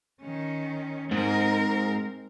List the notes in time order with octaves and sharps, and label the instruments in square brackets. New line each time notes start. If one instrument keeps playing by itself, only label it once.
[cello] D#3 C#4
[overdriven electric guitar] G#2 [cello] C4 A#4